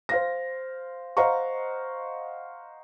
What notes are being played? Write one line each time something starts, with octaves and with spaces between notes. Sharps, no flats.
C5 F5 A#6
C5 D#5 F5 F#5 A#5 C#6